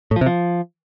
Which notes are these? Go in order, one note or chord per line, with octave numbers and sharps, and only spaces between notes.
A2
F3
C3
F3